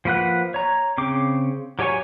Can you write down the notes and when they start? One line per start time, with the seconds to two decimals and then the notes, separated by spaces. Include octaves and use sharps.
0.05 F3 A#3 B4 F#5 F#6
0.54 C#5 A#5
0.98 C#3 C4 D6
1.79 F#3 G4 C#5 G#5 C#6